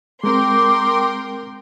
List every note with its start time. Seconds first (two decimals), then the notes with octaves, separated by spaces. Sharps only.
0.24 G#3 C4 A#4 G5 C6 D6